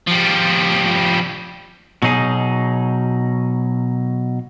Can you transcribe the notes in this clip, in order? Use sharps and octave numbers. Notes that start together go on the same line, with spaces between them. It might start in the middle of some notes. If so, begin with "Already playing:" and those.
F3 G3
B2 F#3 D#4 G#4